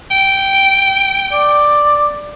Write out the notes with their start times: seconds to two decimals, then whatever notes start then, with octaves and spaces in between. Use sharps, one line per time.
0.11 G5
1.33 D5